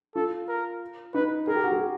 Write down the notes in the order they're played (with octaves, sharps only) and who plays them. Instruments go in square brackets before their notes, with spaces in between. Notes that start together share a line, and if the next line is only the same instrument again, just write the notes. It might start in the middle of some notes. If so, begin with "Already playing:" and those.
[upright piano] F4 [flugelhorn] A4
[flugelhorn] A#4
[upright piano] D#4 [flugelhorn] B4
[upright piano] G#4 [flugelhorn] A#4
[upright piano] G4
F#4
G#4
G4